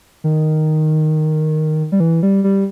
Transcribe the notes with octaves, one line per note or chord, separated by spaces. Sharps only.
D#3
G3
E3
G3
G3